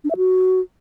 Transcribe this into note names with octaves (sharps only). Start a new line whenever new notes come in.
D4
E5
F#4